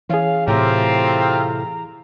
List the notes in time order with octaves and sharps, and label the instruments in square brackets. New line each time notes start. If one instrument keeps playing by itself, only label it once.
[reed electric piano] E3 G#4 [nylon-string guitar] C#4 [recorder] F5
[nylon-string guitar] A2 C3 A3 [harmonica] C4 F4 G4 [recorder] A#5